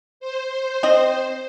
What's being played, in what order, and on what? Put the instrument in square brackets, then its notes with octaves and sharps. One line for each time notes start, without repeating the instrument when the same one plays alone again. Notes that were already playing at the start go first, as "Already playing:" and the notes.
[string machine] C5
[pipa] C4 D#5